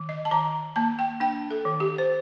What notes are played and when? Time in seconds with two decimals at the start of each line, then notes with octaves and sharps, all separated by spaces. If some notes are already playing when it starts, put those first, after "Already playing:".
Already playing: D#3
0.09 D#5
0.25 A5
0.31 D#3 A#5
0.76 A#3 A5
0.99 G5
1.20 D4 G5
1.51 A4
1.65 D#3
1.80 G4
1.98 C5